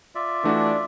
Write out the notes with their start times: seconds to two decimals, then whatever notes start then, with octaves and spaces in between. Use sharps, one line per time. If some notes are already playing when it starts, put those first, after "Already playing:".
0.15 F4 D5 E5
0.44 E3 A3 D4 F#4